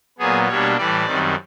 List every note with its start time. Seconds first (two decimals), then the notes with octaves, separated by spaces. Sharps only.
0.18 A#2 F#3 B3 G#4
0.47 B2 G3 A#3 D4 C#5
0.77 A2 E3 G3 D5
1.06 F#2 D#3 G3 C4